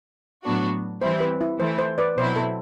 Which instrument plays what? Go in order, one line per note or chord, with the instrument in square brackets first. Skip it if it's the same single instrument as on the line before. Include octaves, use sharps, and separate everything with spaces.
[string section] A2 F#3 B3 D4 F#4
[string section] E3 G3 C4 E4 [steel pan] C5
[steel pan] B4
E4
[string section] E3 A3 E4 [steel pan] C5
[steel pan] C5
B4 D5
[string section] B2 F#3 C4 E4 [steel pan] C5
[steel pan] A4